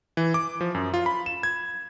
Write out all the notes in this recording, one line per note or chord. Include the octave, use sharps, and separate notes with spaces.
E3
D6
F3
F#2
F4
B5
E7
G#6